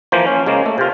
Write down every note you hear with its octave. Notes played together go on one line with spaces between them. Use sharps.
E3 F3 A#3 C5
C#4
C#3 G#3 A#3
A3
C3 F4